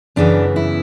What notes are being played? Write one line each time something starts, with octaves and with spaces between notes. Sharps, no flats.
F#2 C#3 E3 B3 D4
E4